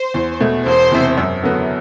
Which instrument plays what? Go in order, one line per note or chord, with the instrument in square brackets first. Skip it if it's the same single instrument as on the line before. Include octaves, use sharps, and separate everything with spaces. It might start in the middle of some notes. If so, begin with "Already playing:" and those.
Already playing: [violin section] C5
[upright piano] E2
B2 A3
[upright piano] E1 [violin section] C5
[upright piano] E2 C3
F#2
D3 F#3 B3